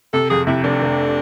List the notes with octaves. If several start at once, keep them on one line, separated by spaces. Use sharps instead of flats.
C3 A4
F2 G#4
C3 E4
F1 D4
F1